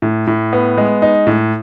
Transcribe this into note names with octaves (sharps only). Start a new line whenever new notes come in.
A2
A2
B3
G#3
D#4
A2